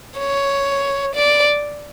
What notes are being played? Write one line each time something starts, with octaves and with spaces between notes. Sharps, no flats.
C#5
D5